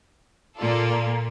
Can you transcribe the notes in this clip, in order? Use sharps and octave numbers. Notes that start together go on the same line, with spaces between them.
A#2 A#3 F4 A4 D5